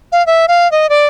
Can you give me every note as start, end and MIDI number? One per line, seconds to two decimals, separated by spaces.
0.12 0.25 77
0.27 0.46 76
0.48 0.70 77
0.72 0.89 75
0.89 1.07 74